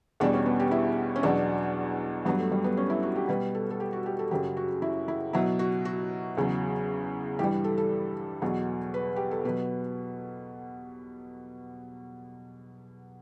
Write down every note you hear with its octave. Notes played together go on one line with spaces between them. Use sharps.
E2 B2 G3 D4
C#4
B3
G4
E4
C#4
E2 B2 F#3 D4
G2 F#3 B3
A3
G3
B3
C#4
E4
F#4
G4
B2 G3 B4
A4
A4
G4
F#4
G4
A4
F#2 C#3 F#3 G4
F#4
E4
E4
B2 F#3 E4
F#4
F#4
E2 C#3 F#3
G2 E3 G3 G4
A4
A4
E2 B2 F#3
B4
G4
A4
B2 F#3 B4